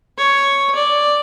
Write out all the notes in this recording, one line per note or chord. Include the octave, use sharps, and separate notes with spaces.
C#5
D5